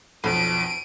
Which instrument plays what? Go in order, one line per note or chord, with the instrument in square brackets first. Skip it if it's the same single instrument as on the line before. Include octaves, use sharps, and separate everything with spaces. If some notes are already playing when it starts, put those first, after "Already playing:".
[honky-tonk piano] B1 F2 [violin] D7 D#7